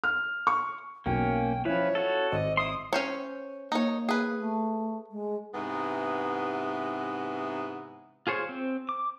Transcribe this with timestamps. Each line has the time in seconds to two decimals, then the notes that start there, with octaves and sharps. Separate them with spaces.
0.04 F6
0.47 C#6
1.06 B1 E2 B2 A#3 C#4 G5
1.65 F3 C#4 E4 B4 C#5
1.95 F#4 A4
2.31 G#1 C4 D5 D#5
2.57 E4 E5 C6 D#6
2.93 C#4 C5 C#5
3.72 A#3 D#4 C#5
4.09 G#4 B4
4.38 A3
5.11 G#3
5.54 G#2 C3 E3 B3
8.27 F4 G#4 C5 C#5
8.49 C4
8.89 D6